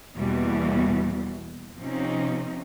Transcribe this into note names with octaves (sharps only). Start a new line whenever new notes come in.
E2 B2 E3 G3 A#3
C3 F3 C4 C#4 D#4